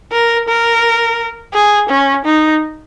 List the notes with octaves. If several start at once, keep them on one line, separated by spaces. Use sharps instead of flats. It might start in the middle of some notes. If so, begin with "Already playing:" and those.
A#4
A#4
G#4
C#4
D#4